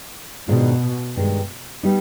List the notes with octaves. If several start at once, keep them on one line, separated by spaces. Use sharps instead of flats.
G#2 B2 D#3 G#3 D4 F4
G2 D#3 G#3
G3 B3 D#4